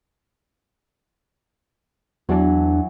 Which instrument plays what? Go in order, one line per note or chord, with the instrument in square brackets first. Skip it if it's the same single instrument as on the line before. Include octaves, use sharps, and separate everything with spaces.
[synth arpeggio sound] E2 D4 [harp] E3 F#3